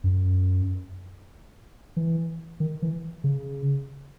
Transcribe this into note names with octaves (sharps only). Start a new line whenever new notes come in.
F#2
E3
D#3
E3
C#3